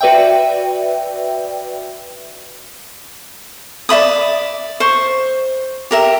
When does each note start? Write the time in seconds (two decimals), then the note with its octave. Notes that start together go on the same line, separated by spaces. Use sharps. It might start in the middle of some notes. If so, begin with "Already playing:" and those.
0.01 F#4 B4 D5 E5 G5
3.89 D5 E5 B5 D#6
4.80 C5 C#6
5.91 G4 A#4 E5